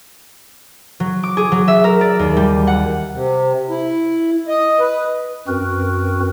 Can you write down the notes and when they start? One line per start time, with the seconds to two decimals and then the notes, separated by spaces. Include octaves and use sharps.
1.00 F#3
1.23 D6
1.37 G#4
1.52 F#3
1.68 E5
1.84 A#4
2.01 D5
2.19 D#2
2.37 G3
2.67 F#5
3.12 C3
3.69 E4
4.48 D#5
4.80 B4
5.48 F#2 C4 F#4 A#4 B4